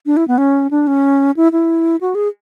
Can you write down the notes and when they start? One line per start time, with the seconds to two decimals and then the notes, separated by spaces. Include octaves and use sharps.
0.06 D4
0.17 E4
0.28 B3
0.38 C#4
0.71 D4
0.87 C#4
1.37 E4
1.52 E4
2.01 F#4
2.15 G#4